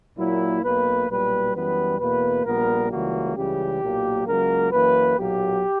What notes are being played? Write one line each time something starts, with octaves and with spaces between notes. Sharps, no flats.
A#2 F#3 A#3 E4
B1 B2 A#3 B4
B1 A#2 G3 B4
F#2 E3 G3 B3 B4
E2 B2 A#3 B4
A#1 A#2 G3 B3 A#4
C#2 C#3 E3 G3 A#3 F#4
C#2 C#3 E3 G3 G4
B1 A#2 F#3 A#3
C#2 C#3 F#3 A#3 A#4
F#2 E3 A#3 B4
B1 A#2 F#3 A#3 G4